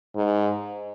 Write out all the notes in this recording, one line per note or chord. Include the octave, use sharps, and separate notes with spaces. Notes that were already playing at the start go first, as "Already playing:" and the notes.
G#2